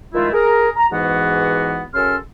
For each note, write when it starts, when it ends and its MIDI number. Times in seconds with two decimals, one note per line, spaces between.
0.14 0.31 51
0.14 0.31 53
0.14 0.31 56
0.14 0.31 57
0.14 0.31 64
0.14 0.31 65
0.33 0.70 68
0.33 0.70 70
0.77 0.87 82
0.92 1.83 40
0.92 1.83 44
0.92 1.83 52
0.92 1.83 59
0.92 1.83 66
0.92 1.83 78
1.94 2.17 42
1.94 2.17 49
1.94 2.17 61
1.94 2.17 69
1.94 2.17 84
1.94 2.17 89